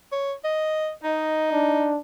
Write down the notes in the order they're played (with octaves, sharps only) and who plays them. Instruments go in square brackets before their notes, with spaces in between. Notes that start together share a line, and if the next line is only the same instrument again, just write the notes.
[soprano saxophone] C#5
D#5
[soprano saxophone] D#4 [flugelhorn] D#5
[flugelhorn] D4